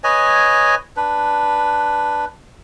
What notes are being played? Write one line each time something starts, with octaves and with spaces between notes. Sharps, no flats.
B4 C#5 D#5 G#5
D4 B4